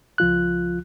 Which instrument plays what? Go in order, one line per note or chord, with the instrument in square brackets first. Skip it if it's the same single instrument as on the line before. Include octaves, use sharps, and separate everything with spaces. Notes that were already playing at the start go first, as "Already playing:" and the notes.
[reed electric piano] C#2 F3 F4 F#6